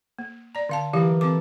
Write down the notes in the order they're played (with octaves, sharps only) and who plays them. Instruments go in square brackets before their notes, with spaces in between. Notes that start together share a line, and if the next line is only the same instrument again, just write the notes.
[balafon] A#3
D5 A#5
D3 F5 A5
[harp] E3 A#3 [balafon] F#3 G4 F5
[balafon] C4 D6 [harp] A4